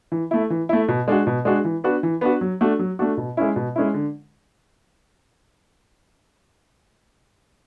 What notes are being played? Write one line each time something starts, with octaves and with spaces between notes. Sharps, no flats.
E3
A3 E4
E3
A3 E4
B2
G#3 D4 F#4
B2
G#3 D4 F#4
E3
B3 D4 F#4
E3
B3 D4 F#4
F#3
A3 D4 F#4
F#3
A3 D4 F#4
B2
G#3 C#4 E4
B2
G#3 C#4 E4
D3